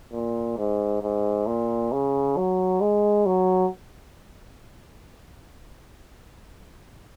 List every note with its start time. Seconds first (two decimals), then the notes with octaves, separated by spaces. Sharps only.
0.12 A#2
0.58 G#2
1.02 G#2
1.47 A#2
1.92 C#3
2.37 F#3
2.81 G#3
3.26 F#3